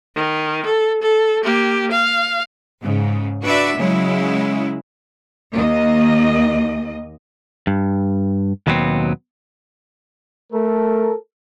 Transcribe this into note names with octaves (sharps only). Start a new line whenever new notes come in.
D#3
A4
A4
A#3 G4
F5
G#2 C#3
D4 F#4 B4 D5 E5
C#3 F#3 G#3 E4
D#2 A#3 D#5
G2
D#2 B2 F#3 B3 C4
A3 A4 A#4